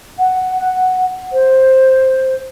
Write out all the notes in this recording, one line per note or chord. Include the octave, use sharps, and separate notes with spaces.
F#5
C5